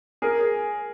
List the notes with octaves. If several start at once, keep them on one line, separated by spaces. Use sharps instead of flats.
G#4 A#4